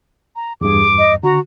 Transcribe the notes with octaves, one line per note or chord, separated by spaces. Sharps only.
A#5
E2 G2 G#4 D6
D#5
D3 F#4 A#5